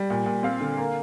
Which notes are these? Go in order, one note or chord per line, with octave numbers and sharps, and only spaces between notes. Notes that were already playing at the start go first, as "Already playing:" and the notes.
Already playing: G3
A#2
A#2
C4 F5
D3
A#3